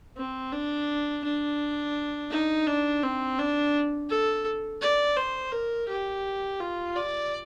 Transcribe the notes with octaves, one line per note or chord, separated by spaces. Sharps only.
C4
D4
D4
D#4
D4
C4
D4
A4
D5
C5
A#4
G4
F4
D5